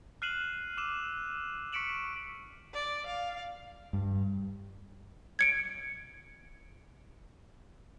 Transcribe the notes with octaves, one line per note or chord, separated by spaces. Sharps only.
F6 F#6 C7 D#7 E7 F#7
D6 E6 D#7 E7
C#6 B6 C#7 D7 E7 F#7
D5
F5
G2
G#6 C#7 D7